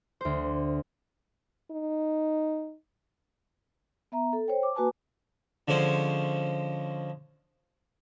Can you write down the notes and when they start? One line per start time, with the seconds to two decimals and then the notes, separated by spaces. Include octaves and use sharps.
0.21 D2 C5
1.71 D#4
4.12 B3 E5 A#5
4.33 A4
4.48 C5 C#5 G5
4.63 D6
4.75 A#3 F#4 B4 G#5 A5 D6
5.68 D3 F3 G#3 C#4 C5